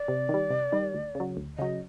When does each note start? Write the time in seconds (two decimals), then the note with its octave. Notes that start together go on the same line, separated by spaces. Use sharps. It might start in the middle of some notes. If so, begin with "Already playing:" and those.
Already playing: D5
0.08 C3
0.29 D#3 G3
0.50 C3
0.72 D#3 G3
0.94 D2
1.15 C#3
1.20 F#3
1.37 D2
1.58 C#3 F#3 D#5